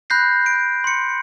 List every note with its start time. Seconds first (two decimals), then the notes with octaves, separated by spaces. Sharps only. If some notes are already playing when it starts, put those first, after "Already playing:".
0.10 B5 F#6 G6 A#6 C7
0.46 D7
0.84 C6 C#7